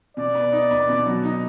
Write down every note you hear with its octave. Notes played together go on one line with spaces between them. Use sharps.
B2 D5
B3
D#4
B3
B2
F#3
D#4